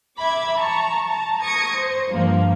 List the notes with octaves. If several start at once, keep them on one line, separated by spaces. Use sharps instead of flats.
E5 B5 D6 G#6
A5 A#5 C#6
A5 A#5
C#6 D#6 G#6 A#6 C#7
C5
G2 F3 A#3